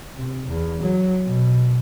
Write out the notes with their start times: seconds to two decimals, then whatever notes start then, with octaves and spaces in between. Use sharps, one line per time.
0.16 C3
0.47 E2
0.82 F#3
1.23 B2